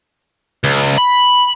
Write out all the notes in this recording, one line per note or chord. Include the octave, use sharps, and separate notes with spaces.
C#2
B5